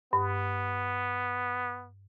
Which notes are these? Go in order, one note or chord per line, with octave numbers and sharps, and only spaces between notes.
G2 B3